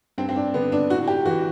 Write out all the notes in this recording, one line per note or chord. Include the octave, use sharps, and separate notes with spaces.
G2 C4
C4
D4
D3 B3
D4
A2 F#4
G4
E3 F#4